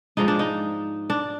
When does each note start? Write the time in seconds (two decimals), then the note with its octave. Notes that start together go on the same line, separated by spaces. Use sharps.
0.17 G#2 F3 G#3 D4 D#4
0.28 D4
0.39 D#4
1.10 D4